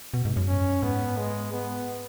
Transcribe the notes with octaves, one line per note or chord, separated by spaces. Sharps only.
B2
G#2
F#2
C#4
G#2 B3
G#3
B3